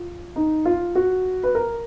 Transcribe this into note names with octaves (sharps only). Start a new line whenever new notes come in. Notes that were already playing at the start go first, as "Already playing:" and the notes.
Already playing: F4
D#4
F4
F#4
B4
A#4